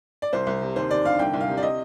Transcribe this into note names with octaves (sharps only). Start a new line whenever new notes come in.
D5
C2 C5
C2
C3
D#2 C5
D#2 D5
D3 F5
C2 G5
C2
F5
C3
D5
D#5